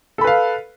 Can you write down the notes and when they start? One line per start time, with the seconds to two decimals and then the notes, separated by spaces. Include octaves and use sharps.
0.18 A4
0.21 B5
0.24 B4
0.27 F5